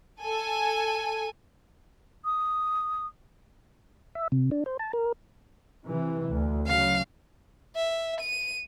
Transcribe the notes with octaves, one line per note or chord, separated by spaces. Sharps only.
A4 G#5
D#6
E5
C3
D4
C5
A5
A#4
C3 E3
D2
C#3 F#3 F5
E5
D#7